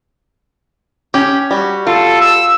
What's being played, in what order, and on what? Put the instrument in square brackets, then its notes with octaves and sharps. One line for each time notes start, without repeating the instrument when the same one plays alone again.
[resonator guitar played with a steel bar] C#4 [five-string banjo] G4
[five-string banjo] G3 F#4
[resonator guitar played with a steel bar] F4 [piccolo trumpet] A4
[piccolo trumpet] E6